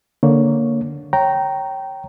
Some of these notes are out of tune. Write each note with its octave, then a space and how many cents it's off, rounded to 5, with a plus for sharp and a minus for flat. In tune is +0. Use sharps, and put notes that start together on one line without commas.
D3 +0 A#3 +0 C#5 +5
C#5 -5 G5 -15 A#5 +0